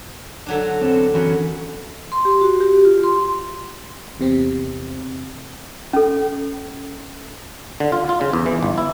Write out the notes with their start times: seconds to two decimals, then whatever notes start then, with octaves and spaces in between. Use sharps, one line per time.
0.46 D3 F#3 D4
0.81 C4 C#4 A4
1.14 F#2 E3 C#4 F#4 B4
2.12 C6
2.25 G4
2.41 F#4
2.60 G4
2.85 F4
3.04 C6
4.20 E2 C3 C4
5.93 C#4 A4
7.80 D3
7.92 F4
8.09 F4
8.21 C#3
8.33 E2
8.46 E3
8.63 G1
8.78 E4